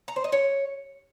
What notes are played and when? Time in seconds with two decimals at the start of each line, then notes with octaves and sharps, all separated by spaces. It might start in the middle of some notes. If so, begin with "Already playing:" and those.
0.08 A#5
0.16 C5
0.24 D#5
0.32 C#5